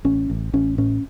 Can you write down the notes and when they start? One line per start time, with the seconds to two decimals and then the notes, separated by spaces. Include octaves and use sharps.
0.05 A1 C#4
0.30 A1
0.53 A1 C#4
0.78 A2 C#4